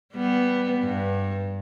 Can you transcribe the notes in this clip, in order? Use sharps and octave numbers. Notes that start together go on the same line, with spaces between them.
G3 B3
G2